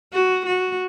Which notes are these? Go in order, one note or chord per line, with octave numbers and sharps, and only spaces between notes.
F#4
F#4